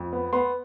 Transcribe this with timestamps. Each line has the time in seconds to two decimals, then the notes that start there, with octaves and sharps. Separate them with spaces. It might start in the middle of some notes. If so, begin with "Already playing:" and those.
Already playing: F2
0.13 B3
0.33 B3 C6